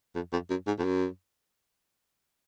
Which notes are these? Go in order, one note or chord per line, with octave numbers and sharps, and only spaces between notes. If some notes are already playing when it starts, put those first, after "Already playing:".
F2
F2
F#2
G#2
F2
F#2